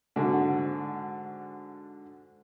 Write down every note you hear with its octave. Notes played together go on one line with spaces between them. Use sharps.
G#2 D3 F#4